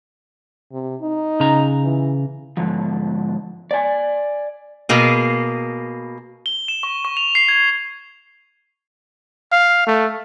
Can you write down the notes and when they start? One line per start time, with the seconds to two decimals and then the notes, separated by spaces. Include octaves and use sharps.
0.72 C3
1.01 D#4
1.40 C#3 A#5
1.84 E3
2.57 G#2 D3 F3
3.71 D5 G#5
4.89 B2 A#3 G#4
6.46 G7
6.68 E7
6.83 C#6
7.05 C#6
7.17 F7
7.35 C7
7.49 G#6
9.52 F5
9.87 A3